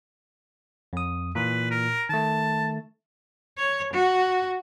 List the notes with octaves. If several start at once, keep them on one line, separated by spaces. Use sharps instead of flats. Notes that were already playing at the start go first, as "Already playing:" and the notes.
F2 D#6
A#2 E3 B4
A#4
D#3 A3 A5
C#5
F#4